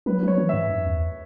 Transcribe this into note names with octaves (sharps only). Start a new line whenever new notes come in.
F#3 B4
F#3 C#5
E3
G#2 E5
F#2
E2